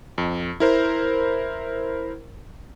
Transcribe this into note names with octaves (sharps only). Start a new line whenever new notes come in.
F2
E4 A#4 C5